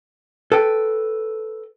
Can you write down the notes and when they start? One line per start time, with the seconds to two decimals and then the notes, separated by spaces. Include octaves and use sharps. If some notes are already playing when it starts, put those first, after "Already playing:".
0.52 A4 B4 G5